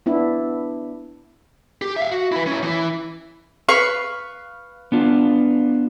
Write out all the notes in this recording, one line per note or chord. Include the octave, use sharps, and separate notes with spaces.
B3 D4 E4
G4
E5 F5
F#4
E4 B4
C#4 E4
E3 E4
B4 F5 C#6
B3 D4 F4